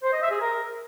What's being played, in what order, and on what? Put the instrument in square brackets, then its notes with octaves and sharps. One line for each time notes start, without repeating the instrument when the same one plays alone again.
[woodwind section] C5
D#5
E5
G#4
A#4